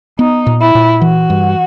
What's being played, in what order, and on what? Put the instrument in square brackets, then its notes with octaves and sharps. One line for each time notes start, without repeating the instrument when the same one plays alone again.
[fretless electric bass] B3 [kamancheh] D#4
[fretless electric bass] A#2
[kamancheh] E4
[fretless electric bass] A#2
[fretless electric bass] E3 [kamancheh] F#4
[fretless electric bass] G2